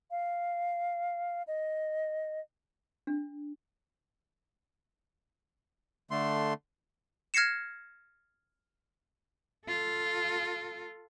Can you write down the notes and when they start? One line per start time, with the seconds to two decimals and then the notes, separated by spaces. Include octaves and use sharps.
0.11 F5
1.47 D#5
3.07 D4
6.11 D3 A3 C6
7.34 F6 G#6 A#6 C7 C#7 E7
9.67 F4 A4